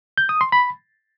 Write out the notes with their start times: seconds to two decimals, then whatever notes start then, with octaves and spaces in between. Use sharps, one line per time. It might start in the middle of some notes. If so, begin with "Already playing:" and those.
0.18 G6
0.29 D#6
0.41 C6
0.52 B5